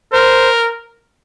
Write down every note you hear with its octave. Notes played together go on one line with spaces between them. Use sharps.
A#4 C5